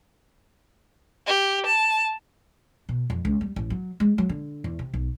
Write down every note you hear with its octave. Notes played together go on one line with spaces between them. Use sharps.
G4
A5
B2
F2
C#2
G3
A1
F#3
G#3
F#3
D3
E2
C3
B1